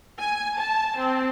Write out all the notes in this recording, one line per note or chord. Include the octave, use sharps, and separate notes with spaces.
G#5
A5
C4